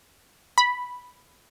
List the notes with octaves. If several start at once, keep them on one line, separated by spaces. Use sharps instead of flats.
B5